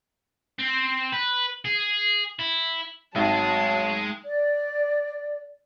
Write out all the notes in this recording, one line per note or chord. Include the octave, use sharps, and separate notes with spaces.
C4
B4
G#4
E4
G#1 F#3 G#3 G#4 A5
D5